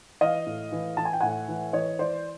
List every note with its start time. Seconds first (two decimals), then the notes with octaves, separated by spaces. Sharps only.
0.21 E3 D#5 F5
0.47 A2
0.72 E3
0.97 E3 A5
1.05 G#5
1.13 G5
1.20 A2 F#5 G#5
1.48 E3
1.73 E3 C#5 D#5
1.99 E3 C5 D5